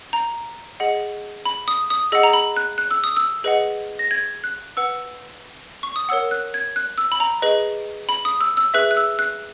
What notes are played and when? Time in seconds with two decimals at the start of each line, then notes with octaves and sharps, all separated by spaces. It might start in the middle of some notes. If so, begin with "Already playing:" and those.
0.13 A#5
0.80 G#4 D#5 F#5
1.46 B5
1.68 D#6
1.90 D#6
2.12 G#4 D#5 F#5 E6
2.23 A#5
2.33 B5
2.56 F#6
2.78 F#6
2.91 E6
3.04 D#6
3.16 E6
3.44 G#4 B4 D#5 F#5
3.99 A#6
4.11 G#6
4.44 F#6
4.77 B4 F#5 E6
5.83 C#6
5.96 D#6
6.09 A#4 C#5 F#5 E6
6.31 F#6
6.54 G#6
6.76 F#6
6.98 E6
7.12 B5
7.20 A#5
7.42 G#4 B4 D#5
8.09 B5
8.25 D#6
8.41 E6
8.57 E6
8.74 G#4 B4 E5 F#6
8.91 F#6
8.97 E6
9.19 F#6